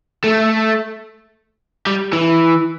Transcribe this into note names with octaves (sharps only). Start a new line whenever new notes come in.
A3
G3
E3